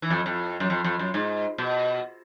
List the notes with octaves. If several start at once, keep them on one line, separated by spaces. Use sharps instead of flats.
E3
F2
F2
F#2
F2
F2
F#2
G#2
B2